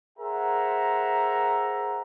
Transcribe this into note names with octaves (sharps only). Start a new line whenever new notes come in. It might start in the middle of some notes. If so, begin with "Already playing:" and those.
G#4 A#4 C5 E5 F#5 A#5